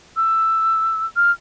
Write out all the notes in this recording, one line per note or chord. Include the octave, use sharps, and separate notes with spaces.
E6
F6